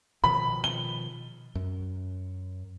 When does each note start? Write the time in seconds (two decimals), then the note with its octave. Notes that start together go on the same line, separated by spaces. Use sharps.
0.24 B2 D#3 F3 B5
0.64 G7
1.55 F#2